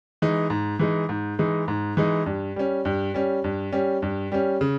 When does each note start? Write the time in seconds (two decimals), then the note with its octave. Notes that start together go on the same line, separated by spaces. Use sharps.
0.22 E3 G#3 D#4
0.50 G#2
0.79 E3 G#3 D#4
1.09 G#2
1.39 E3 G#3 D#4
1.68 G#2
1.97 E3 G#3 D#4
2.26 G2
2.56 G3 C#4
2.85 G2
3.14 G3 C#4
3.44 G2
3.73 G3 C#4
4.02 G2
4.32 G3 C#4
4.61 C#3